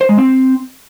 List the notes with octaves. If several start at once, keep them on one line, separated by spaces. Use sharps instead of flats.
C5
G#3
C4